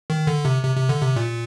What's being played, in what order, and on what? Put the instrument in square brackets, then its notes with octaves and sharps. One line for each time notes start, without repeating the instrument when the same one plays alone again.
[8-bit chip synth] D#3
D3
C3
C3
C3
D3
C3
A#2